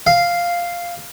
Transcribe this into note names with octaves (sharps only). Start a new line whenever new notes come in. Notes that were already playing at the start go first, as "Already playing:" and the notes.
F5